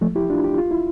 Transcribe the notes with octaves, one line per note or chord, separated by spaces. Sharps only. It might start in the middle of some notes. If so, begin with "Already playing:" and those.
F3 A3
E4 G4
D4 F4
G4
F4
E4